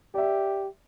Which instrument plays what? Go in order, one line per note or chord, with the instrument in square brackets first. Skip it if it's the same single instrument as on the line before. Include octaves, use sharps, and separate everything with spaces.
[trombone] G4 [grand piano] D5 E5